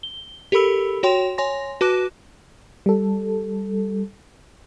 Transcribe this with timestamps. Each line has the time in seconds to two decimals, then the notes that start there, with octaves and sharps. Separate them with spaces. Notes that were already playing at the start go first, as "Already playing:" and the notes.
0.03 G7
0.52 G4 A4 A#4 B5 E6
1.03 F#4 C#5 G5 C6
1.38 C#5 G#5 C6 A#6
1.81 F#4 B4 A5 D6 F#6
2.86 G3 A4